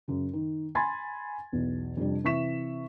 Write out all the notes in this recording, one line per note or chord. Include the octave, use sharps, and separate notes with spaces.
F#2 C#3
D#3
G#5 B5 C6 G#6 A6
B1 E2
F2 C3 G3 D4
C3 E3 E5 C#6 B6 E7